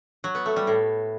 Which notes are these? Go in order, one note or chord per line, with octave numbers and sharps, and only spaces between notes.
F#3
B3
A3
G3
A2